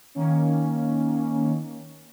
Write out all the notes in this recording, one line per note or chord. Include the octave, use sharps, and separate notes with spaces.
D#3 A#3 C#4